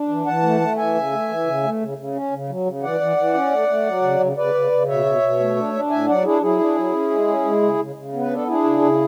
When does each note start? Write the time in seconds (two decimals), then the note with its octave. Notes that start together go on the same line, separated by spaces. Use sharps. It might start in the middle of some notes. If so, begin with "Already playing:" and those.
Already playing: D4
0.08 E3
0.26 E3 F#5 A5
0.43 A3
0.61 A3
0.77 E3 E5 G#5
0.95 C#3
1.12 A3
1.29 E3
1.46 C#3
1.63 A3
1.81 C#3
1.98 C#3
2.15 C#4
2.31 C#3
2.49 F#3
2.66 C#3
2.83 E3 D5 F#5
3.00 E3
3.17 E3
3.34 C#4
3.51 A3
3.68 A3
3.86 F#3
4.02 C#3
4.20 C#3
4.37 C#3 B4 D5
4.54 C#3
4.72 C#3
4.88 B2 C#5 E5
5.05 B2
5.22 B2
5.39 A3
5.56 D4
5.74 D4
5.90 A2 E5 G#5
6.08 F#3 D5 F#5
6.25 D4 E4 G#4
6.41 F#3 E4 G#4
6.59 D4
6.76 F#3
6.93 C#4
7.10 G#3
7.28 C#4
7.45 G#3
7.62 C#3
7.79 C#3
7.96 C#3
8.14 B3
8.21 B4
8.31 D4 A4
8.47 D4 E4 G#4
8.64 C#3
8.82 C#3